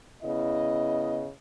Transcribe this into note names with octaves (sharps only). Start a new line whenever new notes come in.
C#3 B3 E4 D#5